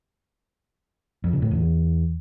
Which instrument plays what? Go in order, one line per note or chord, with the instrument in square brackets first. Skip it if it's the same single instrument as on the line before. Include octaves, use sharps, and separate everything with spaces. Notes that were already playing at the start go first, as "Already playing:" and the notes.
[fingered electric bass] F2
C#3
A2
E2